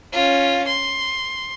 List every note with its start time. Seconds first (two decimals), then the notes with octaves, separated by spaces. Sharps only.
0.12 C#4 F4
0.67 C6